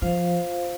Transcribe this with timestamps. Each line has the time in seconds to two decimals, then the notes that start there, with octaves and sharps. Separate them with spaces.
0.02 F3 F4 C5 F5